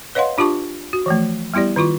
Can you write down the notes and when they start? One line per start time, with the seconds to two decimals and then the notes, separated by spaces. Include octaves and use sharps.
0.15 B4 C#5 D#5 F5 F#5 C6
0.38 D4 F4 G4 A5 C#6
0.93 F#4
1.06 E3 F3 A3
1.54 G3 B3 E4 G4 D5
1.76 D#3 E4 F4 C#6